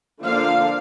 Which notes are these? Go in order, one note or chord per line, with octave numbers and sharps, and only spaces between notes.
D3 F3 A#3 D4 F5